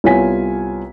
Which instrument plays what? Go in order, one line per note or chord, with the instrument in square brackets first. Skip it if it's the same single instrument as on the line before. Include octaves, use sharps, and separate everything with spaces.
[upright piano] C2 B3 F4 C#5 G#5 B6